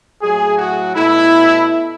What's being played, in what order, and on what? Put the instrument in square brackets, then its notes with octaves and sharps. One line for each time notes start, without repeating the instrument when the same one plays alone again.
[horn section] A2 F#3 A3 G#4
F#4
B2 A3 E4